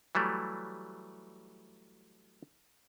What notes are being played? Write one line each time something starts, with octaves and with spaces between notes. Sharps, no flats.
E3 F#3 G3 A3